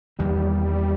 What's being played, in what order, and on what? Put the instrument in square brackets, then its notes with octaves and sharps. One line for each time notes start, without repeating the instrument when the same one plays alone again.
[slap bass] E2 D#3 A#3 [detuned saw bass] G3